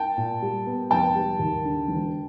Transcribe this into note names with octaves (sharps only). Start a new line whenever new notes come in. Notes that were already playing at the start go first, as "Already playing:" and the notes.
Already playing: G5 A5
A#2
G3
B3
F1 G5 A5
G3
D#2
D3
E1